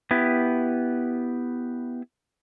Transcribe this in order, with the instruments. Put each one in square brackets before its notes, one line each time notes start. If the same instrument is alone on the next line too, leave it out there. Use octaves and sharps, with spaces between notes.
[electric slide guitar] B3 E4 G4